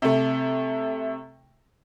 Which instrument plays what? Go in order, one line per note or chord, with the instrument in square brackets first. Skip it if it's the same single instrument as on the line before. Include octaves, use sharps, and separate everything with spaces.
[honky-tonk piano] C3 A3